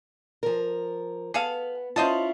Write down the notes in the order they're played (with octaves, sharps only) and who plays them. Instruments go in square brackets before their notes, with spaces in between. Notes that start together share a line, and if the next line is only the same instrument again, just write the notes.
[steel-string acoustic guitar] F3 A#4
[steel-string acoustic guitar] B3 [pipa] G#4 A4 F5
[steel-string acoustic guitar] C#4 E4 F4 [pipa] C5 D#5 A5